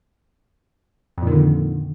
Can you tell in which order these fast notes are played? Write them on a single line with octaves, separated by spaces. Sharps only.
F2 A#2 D#3 D3